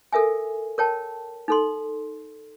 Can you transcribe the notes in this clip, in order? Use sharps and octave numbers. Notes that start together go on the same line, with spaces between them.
A4 A#4 E5 G#5
A#4 C#5 G5 A5
D#4 A4 C6